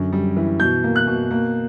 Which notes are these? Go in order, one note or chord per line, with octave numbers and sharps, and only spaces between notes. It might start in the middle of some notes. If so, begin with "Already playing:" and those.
Already playing: F#2 D3
G3
E3
B2 G6
A#3
F#6
B2
A#3